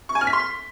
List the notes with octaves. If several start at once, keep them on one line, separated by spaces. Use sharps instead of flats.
C#6
G#5
F6
B6
C6